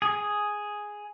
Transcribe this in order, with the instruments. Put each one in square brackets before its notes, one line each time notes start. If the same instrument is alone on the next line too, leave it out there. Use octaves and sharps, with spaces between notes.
[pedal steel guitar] G#4